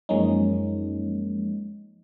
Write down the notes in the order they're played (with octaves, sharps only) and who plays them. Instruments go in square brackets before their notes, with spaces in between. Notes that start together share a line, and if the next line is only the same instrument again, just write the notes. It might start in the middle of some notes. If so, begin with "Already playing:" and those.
[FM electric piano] F#2 F3 G#3 A#3 C#4 D#4